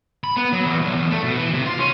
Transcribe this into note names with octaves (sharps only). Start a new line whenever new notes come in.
B5
B3
F#3
E2
B1
E2
A3
B2
E3
C3
F4
C#4